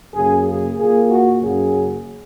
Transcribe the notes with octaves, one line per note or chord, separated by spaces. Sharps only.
F#2 C#3 A#3 G#4
G#4
A#2 A#3 G#4
F#4
F#2 C#3 F#3 A#3 G#4